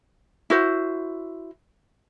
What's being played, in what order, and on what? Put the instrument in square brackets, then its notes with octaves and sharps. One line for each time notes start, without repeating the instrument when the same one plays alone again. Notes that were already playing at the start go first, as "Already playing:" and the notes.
[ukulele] E4 F#4 C5